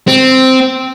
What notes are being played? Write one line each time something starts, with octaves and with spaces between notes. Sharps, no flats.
C4